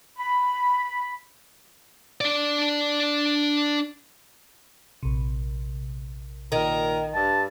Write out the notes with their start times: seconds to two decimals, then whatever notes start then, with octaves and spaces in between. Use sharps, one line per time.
0.16 B5
2.21 D4 D5
5.03 A#1 C3
6.52 A#2 D#3 A#4 A#5
7.15 G2 A5